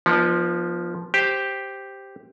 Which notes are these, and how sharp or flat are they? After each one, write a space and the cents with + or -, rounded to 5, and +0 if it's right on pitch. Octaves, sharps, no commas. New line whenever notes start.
F3 +0 B3 -35 D#4 -40
G4 +0 C5 +0